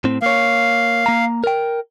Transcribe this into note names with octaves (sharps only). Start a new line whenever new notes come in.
A2 C4
A#3 C#5 F5
A#3 A#5
A#4 G5